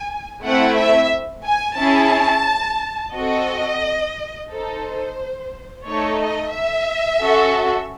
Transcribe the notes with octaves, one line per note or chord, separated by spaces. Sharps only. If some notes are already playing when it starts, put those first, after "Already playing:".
Already playing: G#5
A3 C4 E4 F#5
E5
G#5
C#4 E4 G#4 A5
C4 F#4 A4 D#5
D#4 A4 C5
A3 D#4 A4 C#5
D#5
E5
C#4 F#4 A4